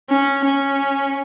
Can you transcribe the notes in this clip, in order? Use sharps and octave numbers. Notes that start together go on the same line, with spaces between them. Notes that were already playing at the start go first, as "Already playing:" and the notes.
C#4
C#4